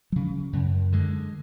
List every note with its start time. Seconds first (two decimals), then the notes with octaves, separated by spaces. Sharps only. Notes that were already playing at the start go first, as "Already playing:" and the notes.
0.12 C#3 F#3
0.53 F#2
0.92 D3 G#3